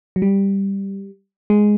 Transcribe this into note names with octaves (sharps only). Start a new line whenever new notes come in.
F#3
G3
G#3